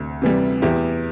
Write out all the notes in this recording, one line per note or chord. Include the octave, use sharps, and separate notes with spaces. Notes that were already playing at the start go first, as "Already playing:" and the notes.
Already playing: D2 C3
C3 E3 G3
E2 E4 G4